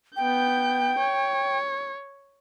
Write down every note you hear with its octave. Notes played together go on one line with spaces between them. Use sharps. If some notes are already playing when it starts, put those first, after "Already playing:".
B3 G5 G6
C#5